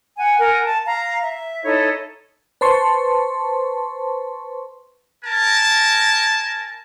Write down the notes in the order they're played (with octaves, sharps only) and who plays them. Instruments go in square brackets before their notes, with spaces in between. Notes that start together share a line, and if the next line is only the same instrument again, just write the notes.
[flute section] F#5 G#5
A#4 F#5 G#5
A5
F5 A#5
E5
D#4 E4 A4 C#5
[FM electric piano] B4 C5 A5 C6 C#6
[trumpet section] A#4 G#5 A5